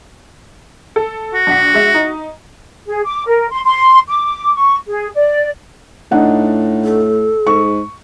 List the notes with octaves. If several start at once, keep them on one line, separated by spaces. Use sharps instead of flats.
A4
F#4
A#1 F#5 B6
G#3 E5
D#4
G#4
D6
A#4
C6
C6
D6
C#6
G#4
D5
A2 D4 D#4 F#5
A4
G#2 C#6